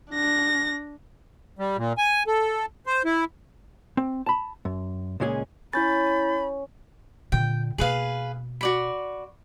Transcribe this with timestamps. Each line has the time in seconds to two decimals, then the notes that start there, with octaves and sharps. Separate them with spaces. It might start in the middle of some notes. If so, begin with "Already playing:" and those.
0.11 D4 A#6
1.59 G3
1.77 A#2
1.98 G#5
2.27 A4
2.86 C5
3.05 E4
3.97 C4
4.26 A5 B5
4.65 F#2
5.20 C#2 A#2 G#3 C#4 F#4 G#4
5.73 C#4 E4 B5 G6 A6
7.32 A#2 D3 G5
7.78 B2 A#3 G#4 B4 F5
8.61 F#4 D5 B5